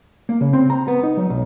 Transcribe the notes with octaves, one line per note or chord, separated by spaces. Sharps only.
A#3
C#3
C4
A#5
B3
D#4
F#3
B1